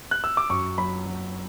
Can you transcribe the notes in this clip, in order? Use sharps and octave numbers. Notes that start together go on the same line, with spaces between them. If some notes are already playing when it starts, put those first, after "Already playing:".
F#6
E6
D6
F#2 C#6
F#3 B5
F#3